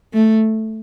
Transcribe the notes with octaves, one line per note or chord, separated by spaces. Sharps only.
A3